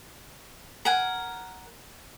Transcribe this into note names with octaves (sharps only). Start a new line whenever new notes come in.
A#4 F#5 G#5